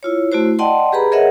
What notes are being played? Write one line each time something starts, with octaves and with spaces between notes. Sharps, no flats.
E4 F4 C#5
A3 E4 F#4 C5
D5 D#5 F#5 G5 A5 C6
G4 G#4 B4 A#5 B5
G#4 A#4 C#5 D#5 E5 F#5